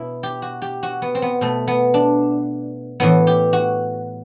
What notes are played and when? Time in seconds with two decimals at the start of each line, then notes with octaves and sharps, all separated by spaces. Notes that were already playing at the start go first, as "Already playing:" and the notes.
Already playing: B2 E4
0.23 G4
0.42 F#4
0.62 G4
0.83 F#4
1.02 B3
1.15 C4
1.22 B3
1.41 B2 A3
1.68 B3
1.94 D4
3.00 A2 E3 B3
3.27 G4
3.53 F#4